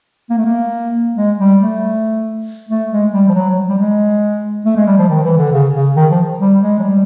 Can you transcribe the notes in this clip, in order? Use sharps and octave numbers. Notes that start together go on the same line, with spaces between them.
A#3
A3
A#3
G#3
G3
A3
A3
G#3
G3
F3
F#3
F#3
G3
G#3
A3
G#3
G3
F3
D#3
E3
D3
C#3
C#3
D#3
F3
G3
G#3
F#3
G3